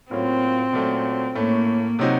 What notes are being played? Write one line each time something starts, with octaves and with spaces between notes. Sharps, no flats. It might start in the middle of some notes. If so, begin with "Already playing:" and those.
A2 F#3 A#3 C4 C#4 F4
A#2 F#3 A3 C#4
A2 A3 A#3 C#4
C3 F#3 C4 D#4 F#4